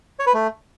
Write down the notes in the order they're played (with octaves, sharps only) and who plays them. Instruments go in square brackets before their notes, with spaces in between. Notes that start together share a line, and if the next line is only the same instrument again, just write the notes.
[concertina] C#5
B4
A3